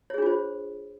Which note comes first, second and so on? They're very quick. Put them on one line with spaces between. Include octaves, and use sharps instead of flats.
C#5 G#4 D4 F4 C5